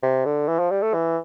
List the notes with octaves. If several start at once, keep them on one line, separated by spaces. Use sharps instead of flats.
C3
D3
E3
F3
G3
A3
E3